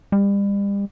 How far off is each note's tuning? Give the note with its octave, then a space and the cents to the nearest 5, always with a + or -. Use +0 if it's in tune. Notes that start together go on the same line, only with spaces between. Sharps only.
G3 +35